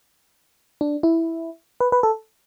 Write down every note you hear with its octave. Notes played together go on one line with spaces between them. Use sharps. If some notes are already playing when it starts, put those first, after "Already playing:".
D4
E4
B4
B4
A4